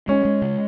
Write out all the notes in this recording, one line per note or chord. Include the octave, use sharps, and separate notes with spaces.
G#3 C#4
G#3
C#3